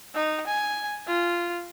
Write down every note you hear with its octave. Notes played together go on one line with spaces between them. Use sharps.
D#4
G#5
F4